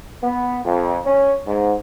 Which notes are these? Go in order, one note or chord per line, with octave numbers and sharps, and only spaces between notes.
B3
F2
C#4
G#2